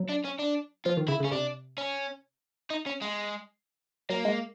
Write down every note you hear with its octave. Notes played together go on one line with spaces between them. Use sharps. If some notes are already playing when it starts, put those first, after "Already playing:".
Already playing: F#3
D4
C#4
D4
F3 F4
D#3
C#3 E4
C#3 C#4
C3 D4
C#4
D#4
C#4
G#3
F#3 A#3
G#3